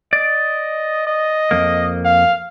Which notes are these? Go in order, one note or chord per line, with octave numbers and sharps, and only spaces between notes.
D5 D#5
D#5
F2 A#3
F5